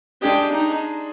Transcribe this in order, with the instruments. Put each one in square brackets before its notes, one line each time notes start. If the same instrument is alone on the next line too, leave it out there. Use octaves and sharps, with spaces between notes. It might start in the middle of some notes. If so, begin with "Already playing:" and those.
[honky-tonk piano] G#3 D4 G#4 D#5 [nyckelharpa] G4
[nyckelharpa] D#4